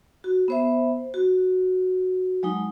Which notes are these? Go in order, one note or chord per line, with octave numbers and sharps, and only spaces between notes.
F#4
B3 C5 E5
F#4
F#3 G#3 D#4